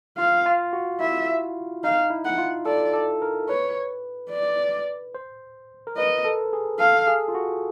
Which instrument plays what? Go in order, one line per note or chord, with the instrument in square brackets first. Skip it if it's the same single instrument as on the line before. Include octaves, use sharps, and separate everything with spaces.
[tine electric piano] F4 [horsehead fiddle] F5
[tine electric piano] F4
F#4
[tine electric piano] E4 [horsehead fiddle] E5
[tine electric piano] D#4 [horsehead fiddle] F5
[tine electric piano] E4
[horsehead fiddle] F#5
[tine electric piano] F4
[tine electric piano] A4 [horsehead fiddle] D5
[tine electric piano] A4
A#4
[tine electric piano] B4 [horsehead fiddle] C#5
[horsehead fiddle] D5
[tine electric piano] C5
A#4
[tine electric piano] B4 [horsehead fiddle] D#5
[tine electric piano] A4
G#4
[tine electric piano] A4 [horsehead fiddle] F5
[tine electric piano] G#4
F4
F#4